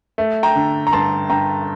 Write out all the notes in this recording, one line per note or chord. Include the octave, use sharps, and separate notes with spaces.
A3
G5 A#5
D3
A#5
G2 A5 C6
G2 G5 A#5